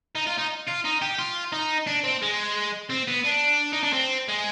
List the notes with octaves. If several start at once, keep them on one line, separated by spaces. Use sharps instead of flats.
D#4
F4
D#4
F4
D#4
G4
F4
D#4
D4
C4
G#3
C4
B3
D4
D#4
D4
C4
G#3